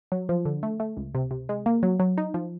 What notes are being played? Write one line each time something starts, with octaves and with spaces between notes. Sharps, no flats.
F#3
F3
D3
A3
A3
C#2
C3
C3
G#3
A#3
F#3
F#3
D#4
F3